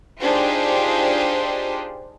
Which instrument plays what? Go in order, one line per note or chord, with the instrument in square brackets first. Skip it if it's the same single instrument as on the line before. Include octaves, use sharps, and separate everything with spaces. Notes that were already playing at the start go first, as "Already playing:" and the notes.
[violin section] D4 D#4 F4 G4 G#4 C5